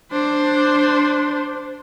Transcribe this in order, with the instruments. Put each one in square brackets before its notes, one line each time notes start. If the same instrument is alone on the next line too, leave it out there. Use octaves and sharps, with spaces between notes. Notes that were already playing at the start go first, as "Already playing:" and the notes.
[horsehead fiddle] D4 C5